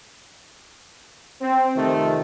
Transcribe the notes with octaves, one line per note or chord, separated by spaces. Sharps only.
C4
F2 C3 D#3 A3 C4